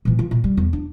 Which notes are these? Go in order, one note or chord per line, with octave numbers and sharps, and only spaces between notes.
A#2 E3
F4
A#2
G3
E2
D4